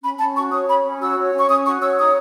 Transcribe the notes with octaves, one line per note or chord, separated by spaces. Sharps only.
C#4 B5
C#4 A5
F#4 C#6
C#5 D#6
C#4 B5
C#4
F#4 E6
C#5
C#4 C#6
C#4 D#6
F#4 C#6
C#5 E6
D#4 D#6